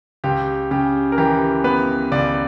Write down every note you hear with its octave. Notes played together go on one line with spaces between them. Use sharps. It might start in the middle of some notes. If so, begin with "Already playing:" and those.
C#2 G4
C#3 G4
A#4
E3 G4
B3 B4
C#2 D5